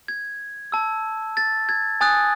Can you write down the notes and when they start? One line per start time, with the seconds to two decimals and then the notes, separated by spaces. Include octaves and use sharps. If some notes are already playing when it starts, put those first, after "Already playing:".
0.08 G#6
0.72 A5 E6
1.37 A6
1.69 G#6
2.01 G#5 D#6 F#6 A6